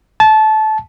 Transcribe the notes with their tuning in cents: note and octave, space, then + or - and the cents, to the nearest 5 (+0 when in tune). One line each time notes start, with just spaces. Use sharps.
A5 -20